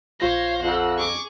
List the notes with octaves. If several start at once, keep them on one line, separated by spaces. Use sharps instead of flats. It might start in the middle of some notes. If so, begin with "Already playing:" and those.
A#1 F4 C5 C#5 F5 A#6
F2 F#5 E6
G#4 C#6 D6